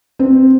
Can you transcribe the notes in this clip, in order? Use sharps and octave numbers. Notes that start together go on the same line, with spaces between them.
C4